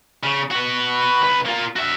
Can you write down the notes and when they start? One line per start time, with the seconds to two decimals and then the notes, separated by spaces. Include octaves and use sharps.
0.23 C#3
0.51 F#4 B4
1.22 C#2 B4
1.46 A#3 F4
1.76 F#4 E5